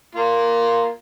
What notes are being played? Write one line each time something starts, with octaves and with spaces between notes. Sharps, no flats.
A#3 F4